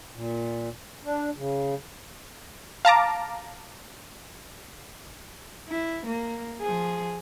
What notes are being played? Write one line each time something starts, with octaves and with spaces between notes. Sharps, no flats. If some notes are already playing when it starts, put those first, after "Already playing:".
A#2
D4
C#3
F5 A5 A#5 D6
E4
A#3
F3 G#4